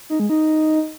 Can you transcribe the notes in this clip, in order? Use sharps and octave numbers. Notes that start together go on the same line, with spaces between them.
D#4
G#3
D#4